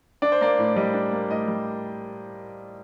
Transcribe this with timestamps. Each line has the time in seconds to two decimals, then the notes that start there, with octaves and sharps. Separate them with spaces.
0.22 D4 D5
0.32 C5
0.41 A#3 D5
0.59 A2
0.76 G3 D#5
0.94 D4
1.12 A#3
1.30 A2 D#5
1.48 G3